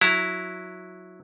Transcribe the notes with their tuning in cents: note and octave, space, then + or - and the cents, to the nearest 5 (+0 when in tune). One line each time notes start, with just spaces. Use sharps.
F#3 -10 E4 -5 A#5 +0